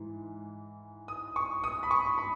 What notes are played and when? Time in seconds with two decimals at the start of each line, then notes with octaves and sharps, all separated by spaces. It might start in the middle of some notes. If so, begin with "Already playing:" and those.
Already playing: G#2 E3
1.08 D#6
1.36 C#6
1.64 D#6
1.83 B5
1.91 C#6
2.18 B5